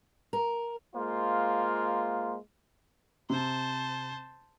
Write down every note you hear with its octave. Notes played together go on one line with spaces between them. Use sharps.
A#4
G#3 A#3 F4 C5
C3 C5 A5